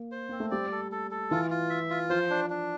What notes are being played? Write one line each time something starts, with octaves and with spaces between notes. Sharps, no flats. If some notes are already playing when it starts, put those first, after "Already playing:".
Already playing: A#3
C5
A#3 C4
A3
G3 D5
A4
A4
A4
E3 F4
F4
E5
F4
F3 C5
D4
D4